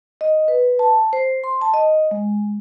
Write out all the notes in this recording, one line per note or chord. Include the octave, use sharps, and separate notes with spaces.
D#5
B4
A5
C5
C6
A5
D#5
G#3